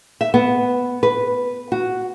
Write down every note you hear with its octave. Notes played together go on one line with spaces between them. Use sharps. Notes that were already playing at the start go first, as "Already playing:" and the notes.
E5
B3
B4
F#4